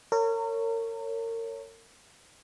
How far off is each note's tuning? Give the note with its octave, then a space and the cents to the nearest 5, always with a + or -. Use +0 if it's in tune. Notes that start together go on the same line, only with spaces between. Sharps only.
A#4 -35 C#5 +0